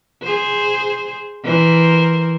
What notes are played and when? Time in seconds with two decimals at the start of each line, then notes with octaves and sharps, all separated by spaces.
0.23 G#4 C5
1.44 E3 A#4 C5